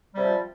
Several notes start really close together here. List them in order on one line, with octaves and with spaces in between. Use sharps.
G3 C3 F3